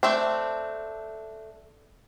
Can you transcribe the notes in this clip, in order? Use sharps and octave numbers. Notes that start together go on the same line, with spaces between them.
A3 C4 D4